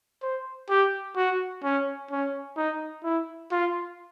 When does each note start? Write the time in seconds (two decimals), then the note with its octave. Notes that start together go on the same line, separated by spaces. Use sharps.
0.22 C5
0.69 G4
1.16 F#4
1.63 C#4
2.11 C#4
2.57 D#4
3.04 E4
3.51 F4